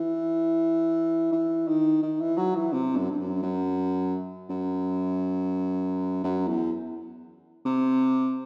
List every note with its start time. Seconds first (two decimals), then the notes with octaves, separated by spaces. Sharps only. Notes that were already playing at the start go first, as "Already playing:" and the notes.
Already playing: E3
1.32 E3
1.68 D#3
2.02 D#3
2.20 E3
2.37 F#3
2.55 E3
2.73 C3
2.96 F#2
3.10 G2
3.20 F#2
3.43 F#2
4.49 F#2
6.24 F#2
6.47 E2
7.65 C3